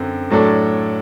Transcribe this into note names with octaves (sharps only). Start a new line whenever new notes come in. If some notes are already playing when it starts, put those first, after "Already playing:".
Already playing: F#2 D3 C4
A2 F#3 A3 D4 A4